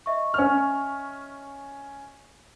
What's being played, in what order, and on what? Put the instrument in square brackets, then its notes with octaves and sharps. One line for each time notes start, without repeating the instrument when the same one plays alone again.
[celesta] D#5 E5 C#6
[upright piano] C#4 F6